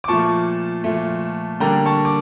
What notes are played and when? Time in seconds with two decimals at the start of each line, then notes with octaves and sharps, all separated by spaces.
0.04 D6
0.08 A#2 F3 A3 A5 C#6
0.84 A#2 F3 A3
1.60 D3 G3 A#3 D4 G5 A#5
1.86 A5 C#6
2.05 D6